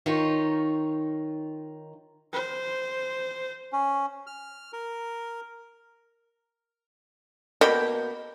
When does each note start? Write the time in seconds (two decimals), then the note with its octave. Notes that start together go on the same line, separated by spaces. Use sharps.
0.06 D#3 D#4 F4 C#5
2.33 C5
3.73 C#4
4.27 F6
4.73 A#4
7.61 B2 A#3 G5 B5